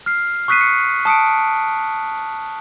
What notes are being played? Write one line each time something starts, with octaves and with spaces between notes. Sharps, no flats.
F6 C7
C#6 D#6 F#6 B6 C7 D#7
C#7
A5 D#6 C#7 D7